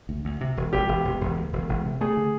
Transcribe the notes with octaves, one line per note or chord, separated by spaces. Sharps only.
D2
D2
C3
E1
E1 G4
E1
E1
E1
D2
E1
E1
C3
A3 G#4
D3